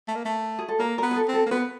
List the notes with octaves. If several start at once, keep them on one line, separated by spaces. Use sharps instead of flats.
A3
A#3
A3
G#4
A4
A#3 A#4
A#4
B3
G#4
A4
C4
A4
A#3
B3 B4